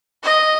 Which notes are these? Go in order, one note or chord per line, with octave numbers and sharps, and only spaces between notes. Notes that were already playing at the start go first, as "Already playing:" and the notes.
D#5